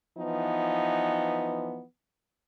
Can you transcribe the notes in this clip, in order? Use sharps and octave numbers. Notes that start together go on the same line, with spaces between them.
E3 F3 B3 D#4